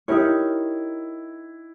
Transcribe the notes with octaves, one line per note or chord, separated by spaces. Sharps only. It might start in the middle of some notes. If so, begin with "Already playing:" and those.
D#4 E4 G4 A#4 C#5